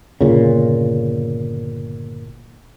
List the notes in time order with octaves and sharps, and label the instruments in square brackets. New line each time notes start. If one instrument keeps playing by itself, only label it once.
[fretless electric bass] G1 A#2 C#3